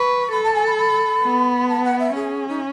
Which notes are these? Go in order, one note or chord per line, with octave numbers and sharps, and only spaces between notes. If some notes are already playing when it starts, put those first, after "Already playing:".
Already playing: B4 C#6
A4 B5
A5
G#5
B5
B5
B3
A5
F#5
E5
C#4 G#4
D#4